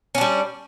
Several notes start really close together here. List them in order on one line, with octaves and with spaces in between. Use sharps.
C#4 D4 G3